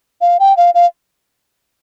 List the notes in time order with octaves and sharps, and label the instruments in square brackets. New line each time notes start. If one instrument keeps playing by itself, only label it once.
[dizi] F5
G5
F5
F5